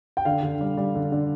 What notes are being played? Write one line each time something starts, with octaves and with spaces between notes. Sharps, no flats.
G5
D3 F5
D3
G3
G3
D3
D3